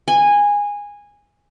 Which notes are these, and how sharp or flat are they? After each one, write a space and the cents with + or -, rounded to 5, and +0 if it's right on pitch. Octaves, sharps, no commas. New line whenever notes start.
G#5 -15